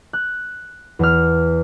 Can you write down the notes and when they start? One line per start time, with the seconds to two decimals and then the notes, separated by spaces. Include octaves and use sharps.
0.13 F#6
0.99 E2 F6